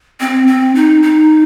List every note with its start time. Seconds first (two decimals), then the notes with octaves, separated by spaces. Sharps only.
0.20 C4
0.47 C4
0.75 D#4
1.03 D#4